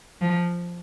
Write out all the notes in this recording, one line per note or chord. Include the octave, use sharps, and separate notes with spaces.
F3